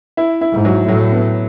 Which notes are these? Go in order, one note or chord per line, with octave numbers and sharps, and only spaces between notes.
E4
E4
G#2
F#3
A2 F#3
B3